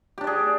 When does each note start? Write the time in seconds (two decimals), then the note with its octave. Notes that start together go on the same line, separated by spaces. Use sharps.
0.18 G4
0.21 D4
0.24 D5
0.27 G#4